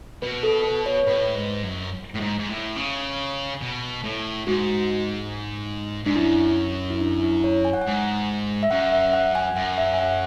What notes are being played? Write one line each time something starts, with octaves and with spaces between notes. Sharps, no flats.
B2 B4
A4
B4
C#5
A2 B4
G#2
F#2
A2
G#2
G#2
A2
C#3
B2
A2
G#2 F#4
G#2 D4
F#2 E4
E4
D4
E4
C#5
G#5
F#5
G#2 G#5
E5
F#2 F#5
E5
F#5
G#5
F#2 F#5
E5
G#5
F#5